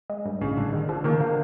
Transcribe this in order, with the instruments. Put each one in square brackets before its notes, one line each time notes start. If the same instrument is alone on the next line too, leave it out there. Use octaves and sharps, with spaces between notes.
[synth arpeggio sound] G#3
G2
[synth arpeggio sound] A1 [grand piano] C#3
[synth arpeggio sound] A1 [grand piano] D3
[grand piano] D#3 [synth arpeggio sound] G#3
[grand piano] D3 [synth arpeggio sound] F3
[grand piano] D#3 [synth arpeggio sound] A#3
[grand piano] D3 [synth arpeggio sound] A#3